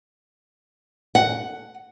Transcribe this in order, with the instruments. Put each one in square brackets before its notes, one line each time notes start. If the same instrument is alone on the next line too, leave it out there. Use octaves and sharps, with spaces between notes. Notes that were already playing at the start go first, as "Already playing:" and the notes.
[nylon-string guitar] F#5